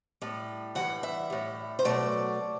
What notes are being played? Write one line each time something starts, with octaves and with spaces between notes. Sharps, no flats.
A2 G3
G2 E3 G3 F#5
E5
A2 G3
C5
B2 F#3 A3 D5